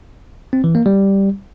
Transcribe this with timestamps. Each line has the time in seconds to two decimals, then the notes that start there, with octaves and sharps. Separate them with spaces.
0.53 C4
0.64 E3
0.75 A#3
0.86 G3